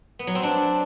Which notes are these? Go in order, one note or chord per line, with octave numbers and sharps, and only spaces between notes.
B3
F#3
C4
D4